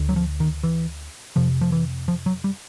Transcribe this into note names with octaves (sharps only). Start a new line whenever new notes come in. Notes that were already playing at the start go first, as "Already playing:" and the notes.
Already playing: D2 D3
F#3
F3
D#3
E3
F2 C3 F3
F3
E3
F3
F#3
G3